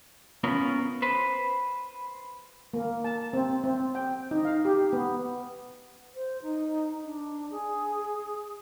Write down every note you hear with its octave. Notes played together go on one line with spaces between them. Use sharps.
B3 C#4 F4 A#4
B4 C5
A#3
A5
C4
C4
G5
D#4
F5
G4
B3
C5
D#4
D4
G#4